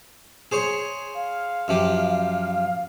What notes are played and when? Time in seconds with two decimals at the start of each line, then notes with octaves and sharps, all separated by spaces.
0.52 G#4 C5 C#5
1.14 F5
1.68 F#2 F3 G4